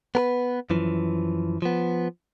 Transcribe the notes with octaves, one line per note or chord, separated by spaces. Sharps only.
B3 A#4 B4
F#2 E3 F3
F3 B3